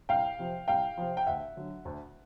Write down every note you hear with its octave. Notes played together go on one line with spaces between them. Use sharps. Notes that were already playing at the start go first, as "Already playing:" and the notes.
C2 F5 G5
C3 F3
C2 F5 G5
C3 F3
G5
D2 E5 F#5
D3 F#3
D2